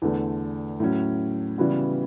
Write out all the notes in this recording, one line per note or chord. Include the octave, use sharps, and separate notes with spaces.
E2 D3 A3
A2 F#3 C#4
C#3 E3 G3 B3 F#4